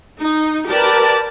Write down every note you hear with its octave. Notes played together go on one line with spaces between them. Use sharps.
D#4
G4 A#4 B4 D5 A5